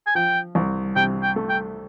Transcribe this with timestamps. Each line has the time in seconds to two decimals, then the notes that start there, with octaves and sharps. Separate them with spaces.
0.07 G#5
0.15 F3 G5
0.55 C2
0.96 C3 G5
1.23 G5
1.36 A3
1.49 G5